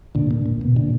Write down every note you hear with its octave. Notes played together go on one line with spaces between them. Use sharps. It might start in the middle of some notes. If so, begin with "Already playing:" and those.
A#2 D3
A#2
A#2
B2
A#2 D3